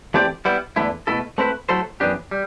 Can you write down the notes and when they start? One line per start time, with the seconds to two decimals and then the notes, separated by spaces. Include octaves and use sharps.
0.14 E3 A3 C4 G4 D5
0.45 G3 B3 E4
0.76 E2 D3 A3 E4
1.07 B2 A3 E4 A4
1.38 A3 C4 E4 B4
1.69 F#3 A3 E4 A4 C5
2.00 F#2 E3 B3 D4 G4
2.31 G3